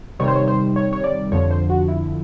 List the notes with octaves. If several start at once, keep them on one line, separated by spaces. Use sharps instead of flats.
C3 D#3 G3 C#5
C5
C#5
C5
C#5
C#5
D5
F2 D3 F3 C#5
C5
F#4
E4